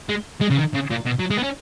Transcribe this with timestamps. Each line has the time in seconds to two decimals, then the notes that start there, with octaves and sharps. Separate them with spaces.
0.09 G#3
0.41 G#3
0.50 C#3
0.57 D#3
0.74 C#3
0.91 A#2
1.06 B2
1.19 F#3
1.31 G#3
1.38 B3
1.43 C#4